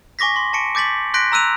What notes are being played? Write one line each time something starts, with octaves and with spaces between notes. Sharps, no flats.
G#5 C#6 D6 A#6 B6
C6
A5 C#6 B6 C#7 D7
D6 G6 A6 B6 F#7
C6 F#6 G6 A#6 B6 D7
A#5 E6 F#6 D#7 F7